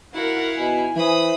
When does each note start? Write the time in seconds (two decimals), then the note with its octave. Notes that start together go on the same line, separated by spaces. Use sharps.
0.14 E4 F#4 A#4 F5 F#5
0.58 B2 G#5
0.96 E3 C5 B5 D#6